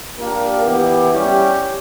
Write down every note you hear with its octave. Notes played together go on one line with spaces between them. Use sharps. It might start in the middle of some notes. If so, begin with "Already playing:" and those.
A#2 A#3 D4 G4 A#4
E3 B3 E4 G4
G3 C#4 G4